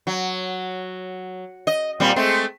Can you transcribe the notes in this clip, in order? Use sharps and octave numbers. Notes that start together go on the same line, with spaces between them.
F#3
D#5
A#2 G3 C4
G#3 A3 C4